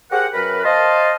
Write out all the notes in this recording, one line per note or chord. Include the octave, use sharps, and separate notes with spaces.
G4 G#4 A#4 C5 F#5
F#2 A#4 B4
C5 D#5 F5 A5